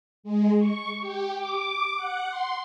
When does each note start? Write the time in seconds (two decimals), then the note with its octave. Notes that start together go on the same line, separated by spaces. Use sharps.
0.23 G#3
0.59 C#6
1.00 G4
1.31 D6
1.96 F#5
2.29 C6